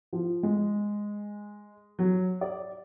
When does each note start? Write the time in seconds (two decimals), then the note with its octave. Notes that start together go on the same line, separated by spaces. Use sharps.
0.13 F3
0.43 G#3
1.99 F#3
2.41 D5